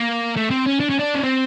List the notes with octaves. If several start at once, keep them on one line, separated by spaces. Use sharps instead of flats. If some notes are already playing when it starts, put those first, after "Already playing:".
Already playing: A#3
A3
C4
C#4
D4
C#4
D4
C#4
C4